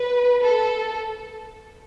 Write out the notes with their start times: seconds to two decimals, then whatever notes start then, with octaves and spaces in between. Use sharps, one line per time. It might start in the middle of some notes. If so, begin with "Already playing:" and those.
Already playing: B4
0.41 A4